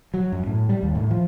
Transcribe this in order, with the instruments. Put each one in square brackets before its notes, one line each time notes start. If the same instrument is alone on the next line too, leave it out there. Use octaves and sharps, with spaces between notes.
[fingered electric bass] F#3
F#2
A2
G3
D#2
A2
F3